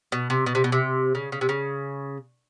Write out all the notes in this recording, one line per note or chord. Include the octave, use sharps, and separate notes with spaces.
B2
C3
B2
C3
B2
C3
C#3
C#3
C3
C#3